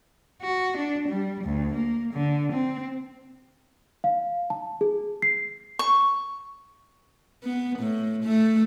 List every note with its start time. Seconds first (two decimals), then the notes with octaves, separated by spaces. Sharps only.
0.42 F#4
0.77 D4
1.08 G3
1.44 D2
1.74 A#3
2.13 D3
2.52 C4
4.04 F5
4.50 A5
4.81 G#4
5.22 C7
5.79 C#6
7.43 B3
7.79 A2
8.23 A3